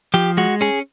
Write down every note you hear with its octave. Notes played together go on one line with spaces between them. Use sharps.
F3 G4
G#3 F#4
C#4 G#4